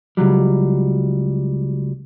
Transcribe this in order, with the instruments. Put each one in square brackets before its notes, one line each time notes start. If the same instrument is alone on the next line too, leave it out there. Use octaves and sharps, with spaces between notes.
[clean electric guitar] C#2 G#2 F#3 G3